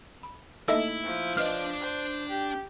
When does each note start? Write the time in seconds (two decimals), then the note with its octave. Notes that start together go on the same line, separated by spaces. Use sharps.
0.23 B5
0.68 A3 A#3 D#4 E4 A4 D#5 E5
1.04 F3
1.37 D4 B4 D5 D#5 F6
1.81 C5
2.29 G4